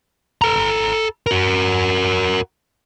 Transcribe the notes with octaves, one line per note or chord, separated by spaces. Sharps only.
A4 A#5
F#4 A#4